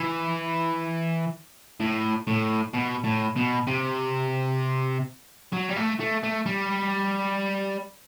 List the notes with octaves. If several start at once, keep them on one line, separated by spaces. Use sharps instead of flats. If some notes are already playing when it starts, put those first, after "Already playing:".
Already playing: E3
A2
A2
B2
A2
B2
C3
F#3
G3
A3
A3
A3
G3